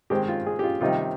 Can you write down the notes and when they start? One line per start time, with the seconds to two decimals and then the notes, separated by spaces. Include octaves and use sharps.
0.10 D#3 G#3 C4 G4
0.28 F4
0.46 G#4
0.59 G4
0.64 F4
0.81 C3 D#3 G3 C4 D#4 F4